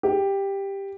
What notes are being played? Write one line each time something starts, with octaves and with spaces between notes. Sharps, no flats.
G4